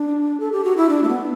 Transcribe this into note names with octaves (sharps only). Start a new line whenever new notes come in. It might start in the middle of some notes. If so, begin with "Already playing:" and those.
Already playing: D4
A4
G4
F#4
E4
D4
A3
B3